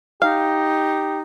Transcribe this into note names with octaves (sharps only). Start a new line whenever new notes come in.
D#4 G4 F5